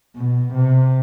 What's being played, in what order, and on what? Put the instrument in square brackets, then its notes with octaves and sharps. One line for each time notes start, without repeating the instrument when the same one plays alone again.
[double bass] B2
C3